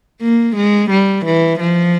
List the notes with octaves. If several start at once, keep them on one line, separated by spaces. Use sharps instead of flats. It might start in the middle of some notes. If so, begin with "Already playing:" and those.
A#3
G#3
G3
E3
F3